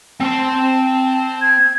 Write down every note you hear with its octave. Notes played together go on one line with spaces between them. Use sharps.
C4 A5 C6
G#6